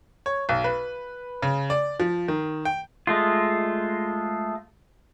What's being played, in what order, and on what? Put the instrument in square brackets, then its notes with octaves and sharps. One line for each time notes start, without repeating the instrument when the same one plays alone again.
[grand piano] C#5
B1
B4
C#3
D5
F3
D#3
G5
[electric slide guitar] G#3 A3 F4